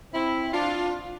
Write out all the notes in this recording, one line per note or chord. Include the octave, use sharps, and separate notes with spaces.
C4 E4
D4 F4